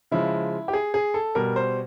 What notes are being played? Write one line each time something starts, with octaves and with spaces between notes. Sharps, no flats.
C#3 F3 G#3 E4
G4
G#4
G#4
A4
B2 G3 A#4
C5